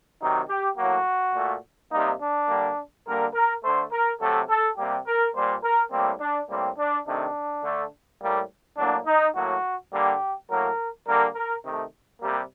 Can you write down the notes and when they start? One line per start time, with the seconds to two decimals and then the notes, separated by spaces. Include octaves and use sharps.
0.20 C3 D#3 F#3 D#4
0.49 G4
0.77 A2 F#3 A#3 F#4
1.35 A#2 A3
1.92 C3 G3 A#3 D#4
2.20 D4
2.49 D3 G3 A#3
3.06 D3 G3 A#3 A#4
3.34 A#4
3.63 D3 A3 C5
3.91 A#4
4.20 C3 F#3 A3 A4
4.49 A4
4.77 C3 G3 A#3 G4
5.06 A#4
5.34 A#2 G3 A#3 C5
5.63 A#4
5.92 A2 G3 A#3 C4
6.20 D4
6.49 A2 G3 A#3 C4
6.78 D4
7.06 C3 D#3 A3 D4
7.63 D3 A3
8.21 A2 G3 A#3
8.77 A2 F#3 A#3 D4
9.06 D#4
9.35 A2 F#3 A#3 F#4
9.92 D3 G3 A#3 G4
10.49 A2 F#3 A#3 A#4
11.06 D3 G3 A#3 A#4
11.35 A#4
11.64 C3 D#3 A3
12.20 C3 G3 A#3